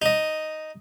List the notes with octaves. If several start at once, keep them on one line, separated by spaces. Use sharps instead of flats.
D#4 D#5